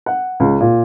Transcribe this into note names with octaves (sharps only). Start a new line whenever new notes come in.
F#5
C#2
A#2